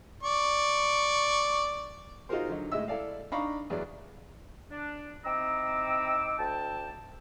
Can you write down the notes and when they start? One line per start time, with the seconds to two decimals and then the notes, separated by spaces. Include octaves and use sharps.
0.23 D5 C#6
2.29 D#4 F4 F#4 G#4 A#4 C5
2.49 D3 F#3 D#4
2.72 A2 G#3 D#5 E5 E6
2.88 E4 A4 D5 F5
3.32 D4 D#4 F5 A#5 B5 C#6
3.70 E2 F#3 B3 G#4 D5
4.71 D4
5.25 C4 D#4 E4 A#5 D6 E6
6.39 D2 G5 A5